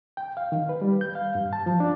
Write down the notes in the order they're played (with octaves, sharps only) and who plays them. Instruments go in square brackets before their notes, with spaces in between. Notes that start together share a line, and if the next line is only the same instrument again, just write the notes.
[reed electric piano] G5
F5
D#3
B4
G3
G6
F5
G2
A5
F3
D4